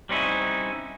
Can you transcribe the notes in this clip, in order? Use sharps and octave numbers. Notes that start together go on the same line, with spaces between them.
G3 C4 C#4 D#4 E4